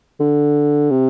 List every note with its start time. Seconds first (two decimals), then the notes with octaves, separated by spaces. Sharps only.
0.20 D3
0.91 C3